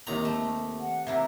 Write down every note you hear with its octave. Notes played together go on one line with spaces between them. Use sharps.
D#2 C3 A#5
A3
F#5
C3 A#3 E4 E5